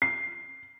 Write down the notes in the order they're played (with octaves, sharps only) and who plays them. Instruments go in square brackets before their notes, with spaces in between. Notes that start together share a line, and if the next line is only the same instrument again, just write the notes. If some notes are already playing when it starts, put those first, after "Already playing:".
[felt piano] C7